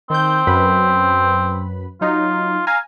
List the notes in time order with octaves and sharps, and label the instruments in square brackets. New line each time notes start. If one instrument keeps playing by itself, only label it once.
[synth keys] D#3 G6 [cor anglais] C4
[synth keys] F#2 B4 B5
[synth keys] F#3 D#4 [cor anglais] F4
[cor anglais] F5 [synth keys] G#5 A#5